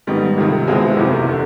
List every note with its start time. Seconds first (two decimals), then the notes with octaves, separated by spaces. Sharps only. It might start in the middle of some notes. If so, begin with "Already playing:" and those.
0.07 G#2 D#3 G3 B3 D#4
0.38 C#2 C3 D#3
0.67 C#2 B2 G#3 C4 E4
0.97 F#1 E2 C3
1.29 D3